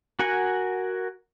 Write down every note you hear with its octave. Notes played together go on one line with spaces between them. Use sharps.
F#4 A#4 F#5 G#5